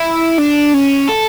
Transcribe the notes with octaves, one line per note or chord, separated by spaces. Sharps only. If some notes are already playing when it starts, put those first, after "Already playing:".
Already playing: E4
D4
C#4
A4